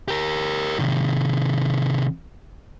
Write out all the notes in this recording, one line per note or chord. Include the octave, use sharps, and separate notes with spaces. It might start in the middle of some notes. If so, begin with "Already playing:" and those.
G4 A#4
C3 D#3